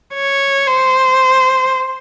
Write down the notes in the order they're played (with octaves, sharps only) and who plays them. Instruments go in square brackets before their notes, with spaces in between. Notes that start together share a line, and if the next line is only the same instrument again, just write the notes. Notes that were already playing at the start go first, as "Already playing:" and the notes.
[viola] C#5
C5